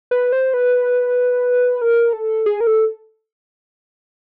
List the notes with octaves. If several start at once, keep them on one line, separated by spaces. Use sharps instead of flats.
B4
C5
B4
A#4
A4
G#4
A#4
A4